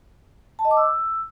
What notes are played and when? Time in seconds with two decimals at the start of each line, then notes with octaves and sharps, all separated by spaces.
0.59 A5
0.65 D#5
0.71 D6
0.77 E6